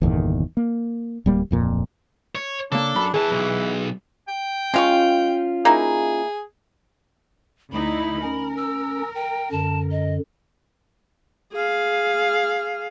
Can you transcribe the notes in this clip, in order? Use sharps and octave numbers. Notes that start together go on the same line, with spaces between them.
G1 E2 A#2 D#3
A#3
D1 G3 A#3
D1 F2 A#2
C#5
C#3 A#3 D4 A4
F#2 B5
E2 E3 G#4 A5
B1
G5
G#3 C#4 F4 F5 C#6
A#3 D#4 E4 G#4
D2 D#4 E4 B5
C#4 A#4
E6
G5
F#2 D3 A5
D#5
G#4 F5